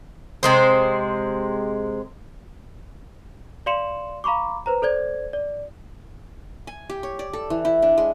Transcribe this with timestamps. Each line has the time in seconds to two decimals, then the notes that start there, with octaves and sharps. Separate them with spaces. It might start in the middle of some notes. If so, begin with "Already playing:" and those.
0.43 C3 G#3 C5
3.66 D5 F5 C6 C#7 E7 F#7
4.24 F5 A#5 B5 C#6 D6
4.66 B4 C5 A#5
4.82 A4 C5 D5 G#6
5.33 D5
6.67 G#5
6.90 G4
7.03 C#5
7.19 D5
7.33 A4
7.50 E3
7.65 E4
7.82 D4
7.98 G#3